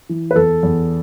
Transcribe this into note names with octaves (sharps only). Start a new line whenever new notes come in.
E3
B4
E2 A4
E2